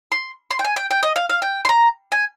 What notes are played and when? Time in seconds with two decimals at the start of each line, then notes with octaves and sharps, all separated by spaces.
0.12 C6
0.51 C6
0.59 G5
0.64 G#5
0.76 G5
0.91 G5
1.03 D#5
1.16 F5
1.30 F5
1.42 G5
1.65 C6
1.69 A#5
2.12 G#5